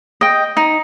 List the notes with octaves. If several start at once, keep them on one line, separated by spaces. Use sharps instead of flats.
D#5 G5
D#4